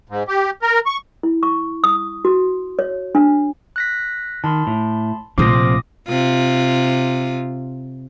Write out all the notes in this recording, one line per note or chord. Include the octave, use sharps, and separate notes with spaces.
G#2
G4
A#4
C#6
E4
C#6
D#6
F#4
C#5
D4
F#6 A#6 B6
D#3 A5 B5 C6
A2
A#1 C3 F3 A3 C4 D6 D#6 A#6
C3 F4